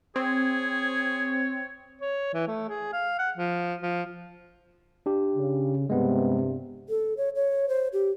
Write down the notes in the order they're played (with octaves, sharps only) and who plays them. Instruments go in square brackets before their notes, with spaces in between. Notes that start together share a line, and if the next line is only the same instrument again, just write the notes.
[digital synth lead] C4 [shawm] G#4 [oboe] C#5
[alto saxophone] C#5
E3
A3
G#4
F5
F#5
F3
F3
[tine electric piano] D4 G4
[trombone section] C#3
[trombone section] G2 C3 [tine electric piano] G#3 B3
[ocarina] A4
C#5
C#5
C5
G4